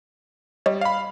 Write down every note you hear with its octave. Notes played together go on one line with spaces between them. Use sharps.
G3 C#5 D#5
F5 B5